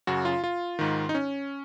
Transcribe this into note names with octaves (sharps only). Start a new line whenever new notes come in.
F#2 C#3 F#4
F4
F4
G#2 D#3
D#4
C#4